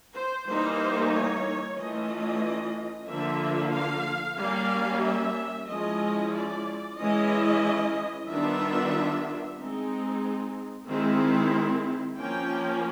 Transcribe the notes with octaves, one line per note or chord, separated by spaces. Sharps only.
C5
E3 G3 A#3 D#4 C5
C#5
E3 A3 C#4 F4 D#5
D3 F3 A#3 E5
F5
G3 A#3 C#4 F5
E5
F3 G#3 C#4 E4 D#5
D5
E3 G#3 C#4 E4 D#5
D#3 G3 B3 D4 F4 E5
G#3 C4 D#4
D#3 G#3 C4 E4
F3 A#3 C#4 G5